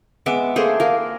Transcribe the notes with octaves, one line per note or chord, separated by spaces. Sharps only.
G#3 B3 E5 D6
A3 A#3 G#4 C5
A#3 A#4